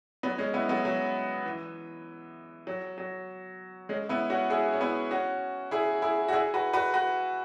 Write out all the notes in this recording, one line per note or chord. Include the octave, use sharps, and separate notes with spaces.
F#3 B3
G#3 C#4
B3 E4
F#3 B3
F#3
E3
F#3
F#3
G#3 C#4
B3 E4
C#4 F#4
E4 G#4
C#4
B3 E4
C#4 F#4
E4 G#4
E4 G#4
F#4
E4 G#4
F#4 B4
F#4 B4
F#4 B4